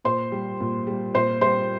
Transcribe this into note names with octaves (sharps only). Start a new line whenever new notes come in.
A#2 C5 C6
G3
A#2
G3
A#2 C5 C6
G3 C5 C6